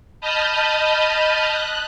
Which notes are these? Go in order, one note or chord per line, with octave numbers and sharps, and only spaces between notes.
D#5 A5 B5 D#6 F6 G6
F#6